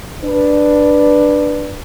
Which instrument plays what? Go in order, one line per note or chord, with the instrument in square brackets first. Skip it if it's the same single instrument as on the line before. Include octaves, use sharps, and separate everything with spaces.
[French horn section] D4 B4